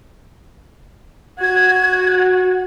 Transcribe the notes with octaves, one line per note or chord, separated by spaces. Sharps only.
F#4 G#6